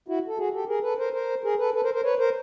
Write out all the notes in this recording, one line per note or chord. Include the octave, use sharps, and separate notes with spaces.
E4 F#4
A4
F#4 G#4
G4 A4
G#4 A#4
A4 B4
A#4 C5
A#4 C5
G#4 A#4
A4 B4
A4 B4
A#4 C5
A#4 C5
B4 C#5
A#4 C5